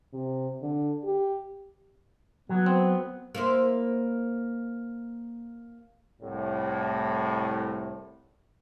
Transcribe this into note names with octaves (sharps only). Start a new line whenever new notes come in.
C3
D3
G4
F#3 B3
C4
A#3 E4 C5
C2 A2